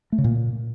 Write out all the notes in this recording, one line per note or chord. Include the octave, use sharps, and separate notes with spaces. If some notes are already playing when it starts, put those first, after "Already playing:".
A3
C#3
A#2